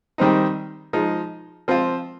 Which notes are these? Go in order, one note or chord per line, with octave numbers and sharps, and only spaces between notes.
D#3 G3 C4 D#4
F3 G#3 D#4
F3 C4 F4